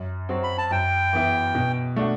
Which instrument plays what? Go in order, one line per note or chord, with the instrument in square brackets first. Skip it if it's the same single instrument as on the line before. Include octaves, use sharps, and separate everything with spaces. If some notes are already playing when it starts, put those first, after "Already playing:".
Already playing: [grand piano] F#2
F#3 C4 F#4 C5
[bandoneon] B5
A5
[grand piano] F#2 [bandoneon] G5
[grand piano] E3 B3 E4
B2
A3 D4 F#4